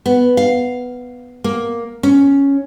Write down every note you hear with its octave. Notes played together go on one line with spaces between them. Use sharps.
B3
F5
A#3
C#4